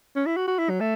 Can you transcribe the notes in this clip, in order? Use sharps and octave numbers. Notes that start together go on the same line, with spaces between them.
C#4
E4
F#4
F#4
E4
F#3
A3